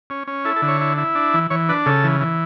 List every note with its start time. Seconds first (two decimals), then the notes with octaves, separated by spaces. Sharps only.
0.10 C#4
0.27 C#4
0.45 E4 A4
0.56 A4
0.62 D3
0.68 C#5
0.81 E4
0.98 E4
1.15 D4
1.34 E3
1.50 E3 C#5
1.69 D4 B4
1.86 C#3 A4
2.04 E3
2.21 E3